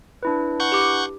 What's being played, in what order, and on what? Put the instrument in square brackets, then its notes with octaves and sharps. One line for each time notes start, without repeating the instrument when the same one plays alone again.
[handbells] D4 E4 B4
[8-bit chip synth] F#5 C#6 G6
[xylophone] G4 D6